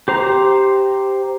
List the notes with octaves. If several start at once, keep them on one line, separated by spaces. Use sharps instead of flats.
G4 C5 A#5